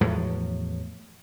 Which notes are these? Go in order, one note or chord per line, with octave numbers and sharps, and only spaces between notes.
E2 A2 F3 F#3